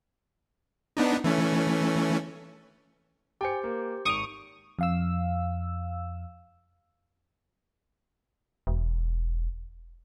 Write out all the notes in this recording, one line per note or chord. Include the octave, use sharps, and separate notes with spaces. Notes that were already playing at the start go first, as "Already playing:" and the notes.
B3 D4 D#4
E3 A3 C#4
G4 C5 G5 G#5 C#7
A#3
G#1 C#6 D#6 D7 F7
F2 F5 E6
E1